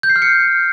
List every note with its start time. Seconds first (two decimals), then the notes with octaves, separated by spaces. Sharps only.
0.03 G6
0.10 C7
0.16 F6
0.22 C#7